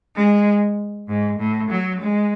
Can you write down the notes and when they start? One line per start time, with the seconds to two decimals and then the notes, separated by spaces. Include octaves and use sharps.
0.16 G#3
1.08 G#2
1.39 A2
1.71 F#3
2.01 G#3